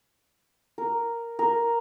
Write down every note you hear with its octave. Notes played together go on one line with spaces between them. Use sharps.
A#4
A#4